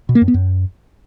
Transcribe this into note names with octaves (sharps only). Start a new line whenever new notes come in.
B2
A#3
F#2
B3
F#2